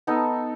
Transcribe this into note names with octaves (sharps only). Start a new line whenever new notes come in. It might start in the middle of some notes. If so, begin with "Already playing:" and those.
B3 D#4 A4